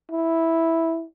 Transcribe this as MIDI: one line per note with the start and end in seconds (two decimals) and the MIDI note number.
0.12 1.04 64